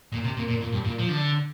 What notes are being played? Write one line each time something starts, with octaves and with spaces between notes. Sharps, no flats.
A#2
C3
A#2
A#2
A#2
G2
A#2
F3
D3